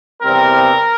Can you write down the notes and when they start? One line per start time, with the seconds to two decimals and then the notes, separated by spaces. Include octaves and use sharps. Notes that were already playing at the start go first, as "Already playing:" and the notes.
0.22 E2 C3 G3 C4 A#4